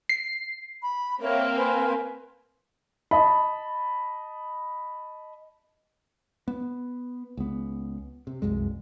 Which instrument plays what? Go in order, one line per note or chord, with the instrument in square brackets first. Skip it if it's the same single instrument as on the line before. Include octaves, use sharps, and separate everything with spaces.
[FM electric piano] C7
[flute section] B5
[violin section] A#3 C4 [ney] A#4 [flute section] C#5 E5
[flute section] B4 C5 G#5
[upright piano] D#5 A5 B5
[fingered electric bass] B3
C#2 B3
C3
F1 C2 F#2 G#3